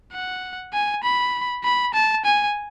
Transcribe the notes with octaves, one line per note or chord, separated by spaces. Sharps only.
F#5
G#5
B5
B5
A5
G#5